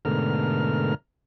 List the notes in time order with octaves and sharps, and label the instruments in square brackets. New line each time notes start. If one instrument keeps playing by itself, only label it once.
[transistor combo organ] G#2 B2 D3 A3 A#4 F6